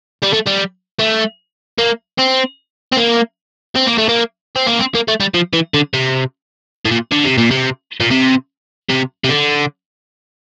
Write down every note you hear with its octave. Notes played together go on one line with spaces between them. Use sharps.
G3
A3
G3
A3
A#3
C4
C4
A#3
C4
A#3
A3
A#3
C4
A#3
C4
A#3
A3
G3
F3
E3
D3
C3
A2
A#2
D3
C3
A#2
C3
A#2
C3
C3
C3
D3